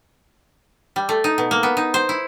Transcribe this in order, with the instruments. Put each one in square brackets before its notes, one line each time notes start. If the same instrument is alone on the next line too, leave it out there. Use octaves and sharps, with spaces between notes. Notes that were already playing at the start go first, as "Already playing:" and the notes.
[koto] G3
A3
D#4
B2
A#3
B3
D#4
C5
E4